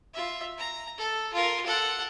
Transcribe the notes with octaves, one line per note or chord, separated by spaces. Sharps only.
F4 E5
A#5
A4
F4 A#4
A4 F#5